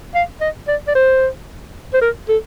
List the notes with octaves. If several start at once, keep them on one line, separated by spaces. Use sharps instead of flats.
F5
D#5
D5
D5
C5
C5
A#4
A4